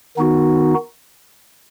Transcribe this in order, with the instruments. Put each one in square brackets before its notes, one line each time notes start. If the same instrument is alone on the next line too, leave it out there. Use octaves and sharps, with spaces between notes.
[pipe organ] D#3 B3 D#4 F#4